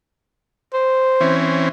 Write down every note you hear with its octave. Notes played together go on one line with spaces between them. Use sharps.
C5
E3 C4 C#4